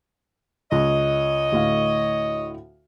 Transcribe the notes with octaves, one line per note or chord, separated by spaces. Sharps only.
C#2 C#5 D#5
D2 A2 F5